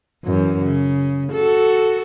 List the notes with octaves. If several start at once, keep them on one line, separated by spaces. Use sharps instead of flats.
F#2 E3
C#3
F#4 A4